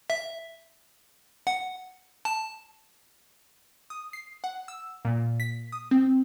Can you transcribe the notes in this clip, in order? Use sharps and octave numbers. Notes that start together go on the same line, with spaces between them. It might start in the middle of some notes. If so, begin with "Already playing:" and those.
E5
F#5
A5
D#6
C7
F#5
E6
A#2
B6
D#6
C4